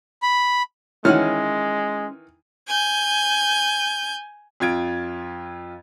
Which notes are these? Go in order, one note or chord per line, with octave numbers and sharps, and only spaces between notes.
B5
D#3 E3 G#3 C#4 C#5 F#5 F6
G#5 G6
F2 F4 G#6 D7